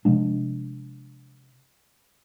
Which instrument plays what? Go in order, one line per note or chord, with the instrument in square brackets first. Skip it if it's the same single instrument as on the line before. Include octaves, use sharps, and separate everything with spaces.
[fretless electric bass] C3 F3 G#3 D4